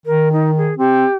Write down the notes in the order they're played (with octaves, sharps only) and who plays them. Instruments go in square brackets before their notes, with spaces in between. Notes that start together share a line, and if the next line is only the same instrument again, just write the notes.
[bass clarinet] D#3 [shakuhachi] A#4
[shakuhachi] D#4
G#4
[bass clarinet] C4 [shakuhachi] G4